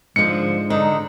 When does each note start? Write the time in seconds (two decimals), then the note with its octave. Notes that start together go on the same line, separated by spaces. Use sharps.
0.16 G#2 D3 F3 G#3 C#7
0.70 D3 D#4